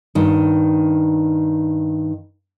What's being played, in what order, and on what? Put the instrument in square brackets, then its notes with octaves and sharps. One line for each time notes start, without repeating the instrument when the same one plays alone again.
[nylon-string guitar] G2 D#3